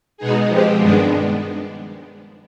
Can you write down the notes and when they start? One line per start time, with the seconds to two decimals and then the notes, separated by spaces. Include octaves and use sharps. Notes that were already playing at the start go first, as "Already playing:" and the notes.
0.17 B2 G#3 B3 D#4 G#4
0.48 F3 G#3 C4 G4
0.78 G2 D#3 G#3 B3 D4